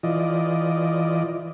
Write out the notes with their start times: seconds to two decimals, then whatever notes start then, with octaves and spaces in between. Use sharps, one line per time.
0.03 E3 F4 D5 D#5